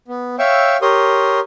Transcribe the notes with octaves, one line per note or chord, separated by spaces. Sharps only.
B3
C#5 E5 F5 G5 C#6 E6
G4 A#4 C#5 C6 D#6